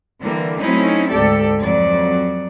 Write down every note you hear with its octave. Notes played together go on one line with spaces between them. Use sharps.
D3 E3 G3 A#3
F#3 A3 C4 C#4 D#4 E4
D2 G#2 G4 A4 D5
F2 F#3 D5